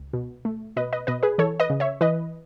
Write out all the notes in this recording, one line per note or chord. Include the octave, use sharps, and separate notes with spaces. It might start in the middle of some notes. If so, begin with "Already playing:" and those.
Already playing: C#2
B2
A3
B2 B4 D#5
B4 D#5
B2 B4 D#5
G#4 B4
E3 A4 C#5
B4 D#5
C#3
C#5 E5
E3 B4 D#5